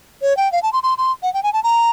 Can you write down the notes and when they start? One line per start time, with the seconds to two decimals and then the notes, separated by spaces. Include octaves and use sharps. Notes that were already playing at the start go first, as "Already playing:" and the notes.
0.22 C#5
0.37 G5
0.52 F5
0.63 A5
0.73 C6
0.83 C6
0.98 C6
1.23 F#5
1.34 G5
1.43 G#5
1.53 A5
1.63 A#5